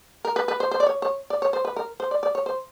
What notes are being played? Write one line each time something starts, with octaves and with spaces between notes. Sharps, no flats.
A#4
B4
B4
C5
C5
D5
C#5
C#5
D5
C#5
C5
B4
A#4
C5
D5
D5
C#5
C5